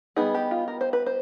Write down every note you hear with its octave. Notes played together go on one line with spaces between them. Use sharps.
G3 B3 D#4 G#4
G4
F4
A#4
C5
B4
C5